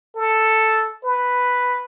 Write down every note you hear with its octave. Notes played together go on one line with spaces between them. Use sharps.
A4
B4